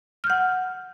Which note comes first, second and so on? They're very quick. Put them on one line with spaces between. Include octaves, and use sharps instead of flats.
F6 G6 F#5